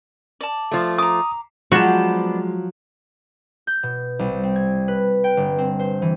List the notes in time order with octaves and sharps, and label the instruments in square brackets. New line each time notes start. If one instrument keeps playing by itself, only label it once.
[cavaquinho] D5 A5
[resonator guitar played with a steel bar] F3 A3
[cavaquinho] A#5 D6 [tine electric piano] D#6
[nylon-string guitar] F3 F#3 [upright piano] G#3 E7 [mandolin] B3 D4 C5 [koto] F#4
[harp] G6
B2
C2
C4
G#6
B4
G5
G1
C4
C5
E3